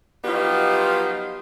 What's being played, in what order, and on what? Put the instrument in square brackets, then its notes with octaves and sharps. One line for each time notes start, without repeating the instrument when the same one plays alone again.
[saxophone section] F3 F#3 B3 D#4 F4 G4